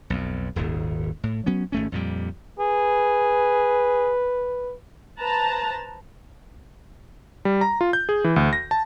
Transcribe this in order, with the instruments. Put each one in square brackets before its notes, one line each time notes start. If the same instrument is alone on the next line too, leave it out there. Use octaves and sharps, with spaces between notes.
[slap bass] B1 F2
D#1 G#1 D#2
A2
F#3 B3 C#4
G#1 A3 C#4
F2 A#2 G3
[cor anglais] G#4 [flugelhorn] B4
[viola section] B4 C5 A5 A#5
[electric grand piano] G3
A#5
F4
G6
G#4
E3
D2
A#6
A5